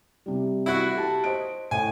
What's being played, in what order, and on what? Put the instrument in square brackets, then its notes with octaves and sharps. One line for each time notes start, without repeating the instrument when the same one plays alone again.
[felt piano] C3 G3
[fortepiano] E4 F#4
[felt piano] G4 A5
C5 D#5 D7
[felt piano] A2 [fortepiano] G#5